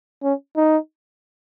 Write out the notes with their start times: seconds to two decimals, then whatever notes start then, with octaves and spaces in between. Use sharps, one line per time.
0.23 C#4
0.57 D#4